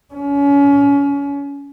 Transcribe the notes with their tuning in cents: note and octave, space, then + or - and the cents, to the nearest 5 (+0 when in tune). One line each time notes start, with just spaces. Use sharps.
C#4 +30